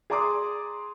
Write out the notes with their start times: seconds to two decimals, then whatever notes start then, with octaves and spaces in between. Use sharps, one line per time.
0.10 G#4 D5 A#5 C6 D6 D#6